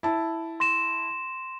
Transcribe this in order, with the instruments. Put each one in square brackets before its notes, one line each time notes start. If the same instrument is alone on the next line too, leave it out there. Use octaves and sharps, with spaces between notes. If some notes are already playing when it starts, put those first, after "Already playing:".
[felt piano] E4 A5
[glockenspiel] C6 A#6 E7